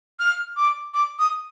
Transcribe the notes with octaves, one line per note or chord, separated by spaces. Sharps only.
F6
D6
D6
D#6